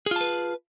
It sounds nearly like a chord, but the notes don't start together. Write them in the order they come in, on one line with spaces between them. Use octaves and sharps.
G#4 F4 A5 B4